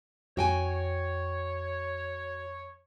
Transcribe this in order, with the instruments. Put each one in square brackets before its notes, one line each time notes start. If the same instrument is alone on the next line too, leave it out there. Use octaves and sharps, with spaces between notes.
[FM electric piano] F2 [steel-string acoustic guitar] F#4 G5 G#5 [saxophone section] C#5